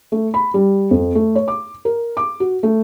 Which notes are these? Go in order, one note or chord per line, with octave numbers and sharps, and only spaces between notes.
A3
B5
G3
F2
A3
C#5
D6
A#4
D6
F#4
A3